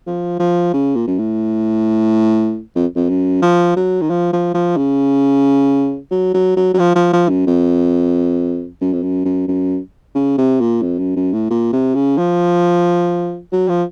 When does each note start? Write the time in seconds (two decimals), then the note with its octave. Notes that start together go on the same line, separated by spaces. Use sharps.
0.07 F3
0.39 F3
0.73 C#3
0.95 A#2
1.07 F#2
1.18 A2
2.75 F2
2.96 F2
3.09 F#2
3.42 F3
3.76 F#3
4.01 D#3
4.10 F3
4.33 F3
4.54 F3
4.77 C#3
6.11 F#3
6.34 F#3
6.56 F#3
6.74 F#3
6.79 F3
6.95 F3
7.13 F3
7.29 F#2
7.47 F2
8.81 F#2
8.93 F2
9.03 F#2
9.25 F#2
9.48 F#2
10.15 C#3
10.37 C3
10.60 A#2
10.82 F2
10.99 F#2
11.16 F#2
11.33 A2
11.50 A#2
11.73 C3
11.95 C#3
12.18 F3
13.52 F#3
13.68 F3